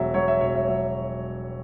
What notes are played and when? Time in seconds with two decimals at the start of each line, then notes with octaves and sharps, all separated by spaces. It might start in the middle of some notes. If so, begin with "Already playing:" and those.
Already playing: E1 F#3 E5
0.14 F#3 C#5
0.28 E5
0.41 E1 C#5
0.55 E5
0.68 F#3 E5